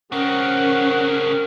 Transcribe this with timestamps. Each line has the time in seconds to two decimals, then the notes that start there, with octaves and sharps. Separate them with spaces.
0.12 C#3 C4 C#4 A#4 F#5